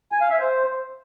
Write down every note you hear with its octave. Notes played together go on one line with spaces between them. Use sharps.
G#5
F5
E5
C5